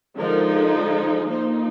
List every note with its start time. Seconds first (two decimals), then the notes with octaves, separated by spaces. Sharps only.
0.16 D3 F3 G#3 D#4 A#4
1.28 F3 A#3 D#4 C5